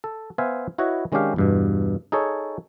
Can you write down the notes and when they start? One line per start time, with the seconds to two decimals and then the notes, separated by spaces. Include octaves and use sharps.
0.04 A4
0.38 B3 C5 E5 F5 G#5
0.78 E4 F#4 B4 C#5 D#5
1.12 D#3 G#3 C#4 D4 G4 F5
1.36 E2 G2 B2
2.12 D#4 G#4 A4 C#5